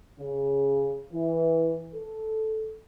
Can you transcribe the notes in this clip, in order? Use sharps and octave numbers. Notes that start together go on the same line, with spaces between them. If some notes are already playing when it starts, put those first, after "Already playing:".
C#3
E3
A4